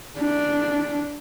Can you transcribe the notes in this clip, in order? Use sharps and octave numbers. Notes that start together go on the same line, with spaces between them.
D4